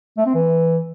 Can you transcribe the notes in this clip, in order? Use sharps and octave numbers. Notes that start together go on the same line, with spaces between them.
A3
C4
E3